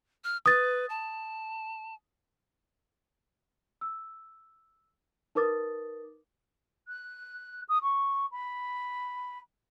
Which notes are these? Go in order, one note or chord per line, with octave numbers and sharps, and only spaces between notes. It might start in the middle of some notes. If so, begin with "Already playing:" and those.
F6
B4 D#6 A6
A5
E6
D#4 A#4 B4 D6 D#6 A6
F#6
D#6
C#6
B5